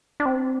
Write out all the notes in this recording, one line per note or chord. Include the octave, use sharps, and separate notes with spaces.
D4
C4